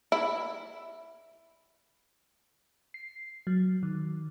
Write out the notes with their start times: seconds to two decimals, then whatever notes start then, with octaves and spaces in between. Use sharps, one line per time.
0.12 E4
2.94 C7
3.47 F#3
3.83 D#3